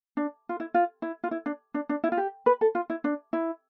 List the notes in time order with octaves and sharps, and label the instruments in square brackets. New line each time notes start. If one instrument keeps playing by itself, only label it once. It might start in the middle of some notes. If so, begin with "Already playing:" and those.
[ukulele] D4
F4
E4
F4
E4
F4
E4
D4
D4
D4
E4
F4
G4
B4
A4
F4
E4
D4
E4